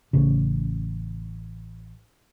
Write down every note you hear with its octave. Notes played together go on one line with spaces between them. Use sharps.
A1 C#3